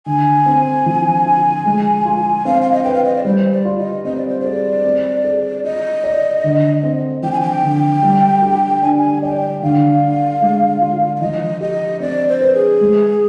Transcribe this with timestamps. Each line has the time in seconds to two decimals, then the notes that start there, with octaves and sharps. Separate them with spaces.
0.06 D3 G#5
0.46 C4
0.86 F3
1.25 F4
1.66 G#3
2.05 F4
2.45 C4 F5
2.62 F5
2.72 D#5
2.83 B4 G5
2.94 F5
3.04 D#5
3.15 D5
3.25 G3 C5
3.51 D5
3.65 F4
3.78 D#5
4.05 C4 D#5
4.16 D5
4.28 C5
4.40 G#4 D5
4.84 C4
5.24 G#4
5.64 F4 D#5
6.04 D5
6.44 D3
6.83 C4
7.23 F3 G5
7.32 G#5
7.41 G5
7.63 D3
8.03 G3
8.42 G4
8.82 D4 G#5
8.97 G#5
9.22 D5 G5
9.62 D3 F5
10.02 D4
10.42 G#3
10.81 F4
11.16 F5
11.21 F3 D#5
11.60 G4 D#5
12.00 C4 D5
12.28 C5
12.41 B4
12.54 G#4
12.81 G#3